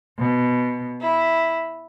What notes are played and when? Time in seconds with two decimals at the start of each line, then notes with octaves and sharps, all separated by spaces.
0.19 B2
1.01 E4